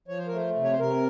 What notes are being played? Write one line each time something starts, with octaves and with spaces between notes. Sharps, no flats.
F3 C#5
C5
A#4
A3 C5
C3
C#5
C5
C3 A#4